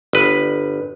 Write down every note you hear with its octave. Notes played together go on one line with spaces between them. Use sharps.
G1 B4